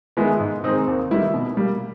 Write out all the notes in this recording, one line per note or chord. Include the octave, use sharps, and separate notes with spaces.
D#3 G#3 B3 E4
G#2
D#3 G#3 C4 D#4
D#2
D#3 G3 B3 E4
B2
G3 A#3